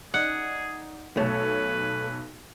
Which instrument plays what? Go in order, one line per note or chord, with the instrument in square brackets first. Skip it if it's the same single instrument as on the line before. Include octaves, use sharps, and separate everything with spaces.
[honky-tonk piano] D#4 D5 [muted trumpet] G#4 [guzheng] F#5
[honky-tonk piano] B1 A4 C#5 [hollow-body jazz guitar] A3 [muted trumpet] B4